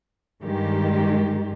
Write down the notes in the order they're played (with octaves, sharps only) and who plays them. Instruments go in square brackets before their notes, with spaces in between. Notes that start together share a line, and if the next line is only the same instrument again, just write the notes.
[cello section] G2 D#3 G#3 G4